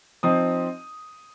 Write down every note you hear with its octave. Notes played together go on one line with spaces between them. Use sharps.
F3 C4 D#4 D#6